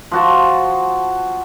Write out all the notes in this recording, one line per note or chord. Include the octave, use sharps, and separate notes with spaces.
F3 F#4 A5